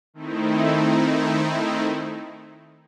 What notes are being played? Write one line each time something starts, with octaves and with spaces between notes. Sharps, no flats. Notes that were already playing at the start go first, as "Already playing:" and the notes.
D#3 A3 C4 D#4 E4